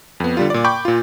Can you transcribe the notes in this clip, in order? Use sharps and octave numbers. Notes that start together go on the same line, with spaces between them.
F2 B3
D3 G3 F4
A#2 D5
G5 B5 C#6 D6 G6
A#2 F4